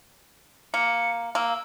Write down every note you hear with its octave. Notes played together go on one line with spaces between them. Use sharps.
A#3 C#7
A#3 E6